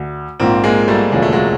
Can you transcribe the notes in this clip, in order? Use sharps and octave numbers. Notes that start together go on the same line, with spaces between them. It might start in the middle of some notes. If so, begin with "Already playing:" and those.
Already playing: D2
A#1 G#2 F3 A#3 C4
G#3 A#3
G3 A3
E1 D2 C#3 F3 G#3
A3
F#3 G#3